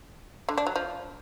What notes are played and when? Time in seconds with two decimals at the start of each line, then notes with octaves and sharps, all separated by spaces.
0.49 D3
0.58 D4
0.67 F#3
0.76 F3